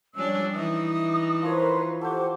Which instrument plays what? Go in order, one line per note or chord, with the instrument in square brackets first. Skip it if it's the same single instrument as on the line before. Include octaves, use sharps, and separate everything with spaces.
[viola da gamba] F3 G3 D4 [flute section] C#4 E6
[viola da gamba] E3 D#4 [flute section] D#6
[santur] F3 C#5 [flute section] A#4 B4 C6
[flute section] G4 F#5 D6 [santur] A4 C5